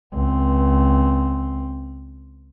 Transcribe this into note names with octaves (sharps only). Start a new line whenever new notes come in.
C#2 C4